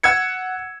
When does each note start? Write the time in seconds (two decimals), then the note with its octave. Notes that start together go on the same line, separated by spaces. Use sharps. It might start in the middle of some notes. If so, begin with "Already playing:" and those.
0.03 F#5 E6 G#6 C#7